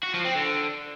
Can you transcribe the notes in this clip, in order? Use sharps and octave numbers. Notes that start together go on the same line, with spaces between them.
F#4
F3
C4
D3